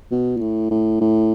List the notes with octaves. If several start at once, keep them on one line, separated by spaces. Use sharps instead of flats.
B2
A#2
A2
A2
A2